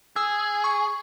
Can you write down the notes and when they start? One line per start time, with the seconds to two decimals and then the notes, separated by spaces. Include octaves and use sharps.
0.16 G#4 E6
0.64 C#6